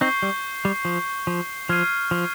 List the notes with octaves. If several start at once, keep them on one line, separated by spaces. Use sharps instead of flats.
C4 D#4 C#6 G6 C7 G7
G3
G3
F3
F3
F3 F6 G#6 C7 D#7
F3